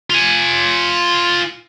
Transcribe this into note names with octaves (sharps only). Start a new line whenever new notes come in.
F4 G#5